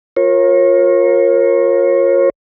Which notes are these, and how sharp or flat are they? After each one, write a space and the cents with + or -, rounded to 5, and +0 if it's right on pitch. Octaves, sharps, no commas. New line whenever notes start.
F4 +20 A#4 +0 C#5 -35